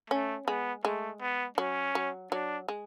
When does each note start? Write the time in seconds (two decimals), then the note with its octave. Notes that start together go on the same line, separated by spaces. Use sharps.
0.10 A3 C#4
0.47 G#3 B3
0.85 G#3 A3
1.21 B3
1.58 F#3 C#4
1.95 F#3
2.32 F#3 D4
2.68 G#3